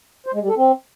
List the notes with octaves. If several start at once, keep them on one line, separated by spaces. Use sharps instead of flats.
C5
G#3
G3
A4
C4